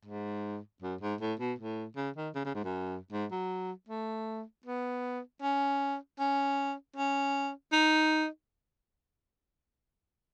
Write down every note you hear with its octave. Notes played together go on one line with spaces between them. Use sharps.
G#2
F#2
G#2
A2
B2
A2
C#3
D#3
C#3
C#3
G#2
F#2
G#2
F#3
A3
B3
C#4
C#4
C#4
D#4